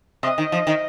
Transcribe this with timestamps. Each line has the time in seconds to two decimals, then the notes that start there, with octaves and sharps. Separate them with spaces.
0.23 C3 D#5
0.38 D#3
0.52 F3
0.67 D#3